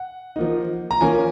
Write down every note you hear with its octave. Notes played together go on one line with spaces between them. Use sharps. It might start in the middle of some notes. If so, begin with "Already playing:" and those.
Already playing: F#5
F3 A#3 D#4
A#5
F3 A#3 C#4 G#5